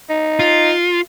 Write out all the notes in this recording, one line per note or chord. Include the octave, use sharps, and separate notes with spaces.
D#4
F4